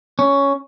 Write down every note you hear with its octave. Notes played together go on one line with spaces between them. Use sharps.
C#4